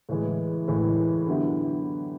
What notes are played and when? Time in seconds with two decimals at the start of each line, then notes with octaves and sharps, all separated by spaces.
0.09 A2 E3 G#3
0.68 A2 E3 G#3
1.27 D3 F#3 B3 E4 G4